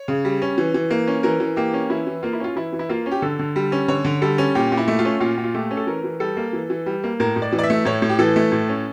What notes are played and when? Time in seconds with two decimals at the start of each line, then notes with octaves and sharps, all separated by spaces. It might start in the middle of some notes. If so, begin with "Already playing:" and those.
Already playing: C#5
0.08 C#3
0.25 G3
0.42 C#4
0.58 E3
0.74 E3
0.91 A#3
1.07 C#4
1.23 E3 A#4
1.40 E3
1.56 A#3 G4
1.73 C#4
1.90 E3 E4
2.07 E3
2.23 A#3 F4
2.33 E4
2.40 C#4 F4
2.56 E3 E4
2.73 E3
2.79 E4
2.89 A#3 F4
3.06 C#4
3.12 G4
3.22 D3 A4
3.39 D3
3.56 G3
3.72 C#4
3.88 D3 C#5
4.05 D3
4.22 G3 A4
4.38 C#4
4.55 A#2 G4
4.72 A#2
4.77 E4
4.88 A3
4.99 F4
5.05 C#4
5.20 A#2 F4
5.38 A#2
5.44 F4
5.54 A3 G4
5.71 C#4
5.77 A4
5.87 E3 A#4
6.04 E3
6.20 G3 A4
6.37 A#3
6.53 E3
6.70 E3
6.86 G3
7.04 A#3
7.20 A2 A#4
7.36 A2
7.42 D5
7.52 E3
7.59 D5
7.63 E5
7.70 A3
7.85 A2 C#5
8.02 A2
8.09 G4
8.19 E3 A4
8.36 A3
8.52 A2
8.69 C#4